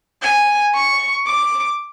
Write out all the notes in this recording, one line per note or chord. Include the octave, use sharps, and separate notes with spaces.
G#5
C#6
D6